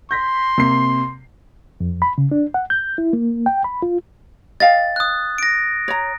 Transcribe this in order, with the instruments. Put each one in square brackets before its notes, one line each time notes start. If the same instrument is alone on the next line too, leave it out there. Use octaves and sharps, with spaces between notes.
[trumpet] C6 [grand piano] G6 A#6 B6
[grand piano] C3 A#3 C7
[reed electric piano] F2
B5
C#3
D4
F#5
G6
E4
A#3
G5
B5
F4
[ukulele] D#5 F5 G5 [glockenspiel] A6
[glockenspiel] D#6 F#6
A#6 D7
[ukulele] C#5 A#5